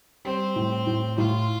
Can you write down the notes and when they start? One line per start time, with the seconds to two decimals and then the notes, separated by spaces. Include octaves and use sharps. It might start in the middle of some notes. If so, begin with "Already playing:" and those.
0.25 G3 C4
0.56 A2
0.87 A2
1.18 A2 F4